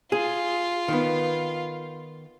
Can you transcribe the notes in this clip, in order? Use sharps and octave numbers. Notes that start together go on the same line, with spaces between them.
F4 G#4
D#3 B3